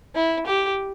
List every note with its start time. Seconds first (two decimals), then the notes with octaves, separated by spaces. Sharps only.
0.15 E4
0.46 G4